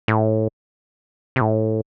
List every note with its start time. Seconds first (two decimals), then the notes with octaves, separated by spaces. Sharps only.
0.08 A2
1.36 C3
1.41 A2